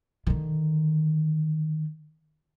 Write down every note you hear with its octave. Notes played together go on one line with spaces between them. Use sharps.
D3 D#3